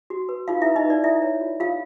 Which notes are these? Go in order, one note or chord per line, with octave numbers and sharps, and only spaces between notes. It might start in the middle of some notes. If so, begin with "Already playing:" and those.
F#4
B4
D#4 F4 F5
E4 E5
B4
D#4 D#5
B4 D5
E4 F4 E5
C#5
F4
F4 F5